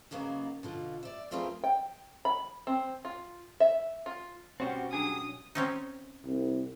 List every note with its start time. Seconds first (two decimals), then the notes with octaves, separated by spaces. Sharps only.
0.11 C#3 F#3 A#3 B3 D#4
0.63 B2 D3 F4
1.03 D5 E5
1.31 A3 C4 F4 G#4 A#4 B4
1.64 G5
2.25 B5
2.67 C4
3.05 F4
3.60 E5
4.06 F4
4.60 B2 G3 C4 C#4 F#4 G4 F#5
4.93 F#3 D4 G4 G#4 D#6
5.55 C4 C#4 D#4
6.25 C2